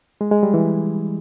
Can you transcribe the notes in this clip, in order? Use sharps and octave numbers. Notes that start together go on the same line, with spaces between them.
G#3
G#3
G3
E3